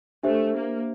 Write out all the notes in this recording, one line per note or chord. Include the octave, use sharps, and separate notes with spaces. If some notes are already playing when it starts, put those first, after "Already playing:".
A3 D4 G4 C5 E5
A#3